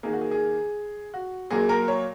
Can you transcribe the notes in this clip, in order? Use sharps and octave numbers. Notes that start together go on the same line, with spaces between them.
D#3 A#3 G#4
F#4
G#4
G#4
F#4
A#2 F#3 A#3 G#4
A#4
C#5